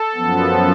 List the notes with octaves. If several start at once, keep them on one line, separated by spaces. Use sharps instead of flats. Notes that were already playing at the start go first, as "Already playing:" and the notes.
Already playing: A4
F#2 F3 B3